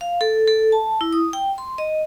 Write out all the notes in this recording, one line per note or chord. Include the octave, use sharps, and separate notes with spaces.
F5
A4
A4
A5
E4
D#6
G5
C6
D#5